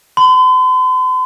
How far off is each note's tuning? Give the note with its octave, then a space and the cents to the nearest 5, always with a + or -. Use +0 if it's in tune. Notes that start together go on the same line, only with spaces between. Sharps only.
C6 -45